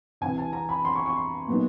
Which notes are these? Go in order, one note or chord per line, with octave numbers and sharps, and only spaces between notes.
C2 C3 E3 G#5
A5
A#5
B5
C6
C#6
C#6
C6
A#2 F#3 B3 D#4